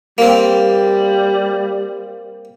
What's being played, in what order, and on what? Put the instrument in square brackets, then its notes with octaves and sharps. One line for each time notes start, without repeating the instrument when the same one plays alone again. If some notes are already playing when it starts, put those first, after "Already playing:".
[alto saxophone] G3 [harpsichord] A#3 C4